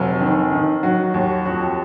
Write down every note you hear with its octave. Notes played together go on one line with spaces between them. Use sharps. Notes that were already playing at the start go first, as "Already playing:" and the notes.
Already playing: F1 F#3
D#3
D#3
F#3 F#4
D#2
F2 F#4